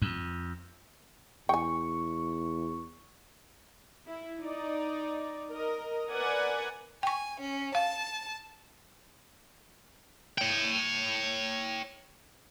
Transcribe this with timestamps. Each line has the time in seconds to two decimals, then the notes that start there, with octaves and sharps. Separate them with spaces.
0.02 F2
1.49 E2 G5 G#5 C#6
4.07 E4
4.41 D#4 D5
5.50 A#4 D#5
6.10 A#4 B4 D5 F#5 G#5
7.03 G5 G#5 C#6
7.40 C#4
7.75 F5 A5
10.38 C#5 G5